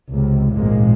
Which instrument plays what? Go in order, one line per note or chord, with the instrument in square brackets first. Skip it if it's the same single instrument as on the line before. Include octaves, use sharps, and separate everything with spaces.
[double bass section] C#2 C3
G#1 A#2 F3 G#3 A#3